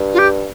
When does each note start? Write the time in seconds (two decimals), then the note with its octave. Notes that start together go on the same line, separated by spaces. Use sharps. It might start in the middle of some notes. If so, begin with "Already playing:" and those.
Already playing: G2
0.13 F4
0.18 G4